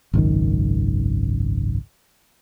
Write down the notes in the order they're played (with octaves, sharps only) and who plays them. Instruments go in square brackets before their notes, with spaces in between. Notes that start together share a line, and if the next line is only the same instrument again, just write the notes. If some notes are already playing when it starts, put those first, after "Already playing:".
[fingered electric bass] G#1 C#2 F#2 D#3